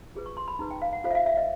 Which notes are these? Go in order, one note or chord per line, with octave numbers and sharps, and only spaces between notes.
F4 G#4 B4
C#6
C6
B5
D#4 G#4 B4 A#5
G5
F5
F#5
F4 A4 C5 F5
E5
F5
E5
D#5